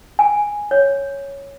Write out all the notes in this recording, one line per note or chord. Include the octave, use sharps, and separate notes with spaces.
G#5
C#5